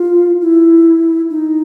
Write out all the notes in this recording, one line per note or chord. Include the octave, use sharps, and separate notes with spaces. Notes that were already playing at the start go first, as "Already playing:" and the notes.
Already playing: F4
E4
D#4